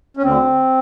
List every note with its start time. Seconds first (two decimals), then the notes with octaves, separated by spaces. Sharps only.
0.17 C#4
0.23 D2 D3 C4